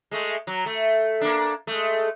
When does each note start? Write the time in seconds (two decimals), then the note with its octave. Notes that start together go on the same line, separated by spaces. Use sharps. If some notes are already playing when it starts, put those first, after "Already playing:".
0.11 G#3 A3
0.47 F#3
0.66 A3
1.21 A#3 D4
1.67 G#3 A3